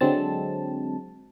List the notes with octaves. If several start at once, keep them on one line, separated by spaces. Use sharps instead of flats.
D3 F#3 G#3 C4 A5